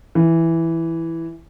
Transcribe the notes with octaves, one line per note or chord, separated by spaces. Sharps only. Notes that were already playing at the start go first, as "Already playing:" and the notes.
E3